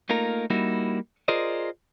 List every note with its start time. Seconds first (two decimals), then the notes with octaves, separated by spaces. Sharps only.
0.09 A3 A#3 D#4 F4 A#4
0.50 G3 A#3 D#4 E4 F#4
1.28 F4 G#4 A#4 C5 D5 D#5